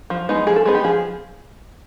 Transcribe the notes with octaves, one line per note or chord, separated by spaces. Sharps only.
F3
G#3 B3 D#4
F3 G#4
A4
G#3 B3 D#4 G#4
G4
F3 G#4